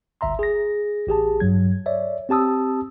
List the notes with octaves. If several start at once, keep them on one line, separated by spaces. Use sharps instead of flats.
G1 C#2 E5 A#5 C6
G#4 A#6
A1 G4 G#4 A5
G2 F#3 G#6
C#5 D5 E5
C4 G4 A5 D#6 E6